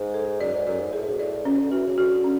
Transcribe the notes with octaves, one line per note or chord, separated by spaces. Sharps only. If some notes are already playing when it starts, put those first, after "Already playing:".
Already playing: G#2
A4
F#2 D5
G#2
F#2 D5
G#2
A2 G#4
B2
A2 D5
B2 C#4
D3
E3 F#4
C#3
D3 F#4
C#4